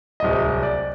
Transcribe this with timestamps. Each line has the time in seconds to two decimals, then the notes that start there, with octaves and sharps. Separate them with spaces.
0.20 D1 C2 D#5
0.63 D5